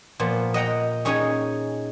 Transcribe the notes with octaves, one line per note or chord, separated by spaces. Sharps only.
A#2 F3 B3
D#5 F#5 G5 A#5
C#4 D#4 G#4 C#5 G5 G#5